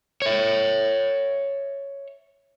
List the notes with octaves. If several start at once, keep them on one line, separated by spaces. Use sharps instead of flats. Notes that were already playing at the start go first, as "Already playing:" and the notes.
C#5 E5